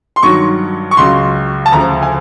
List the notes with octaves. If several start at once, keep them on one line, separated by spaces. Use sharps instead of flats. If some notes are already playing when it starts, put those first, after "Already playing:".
C6
G2 D#3 F#3 C#6
C#6
C#2 C#3 F#3 C6
A5
D2 C#3 F3 A#5
G#5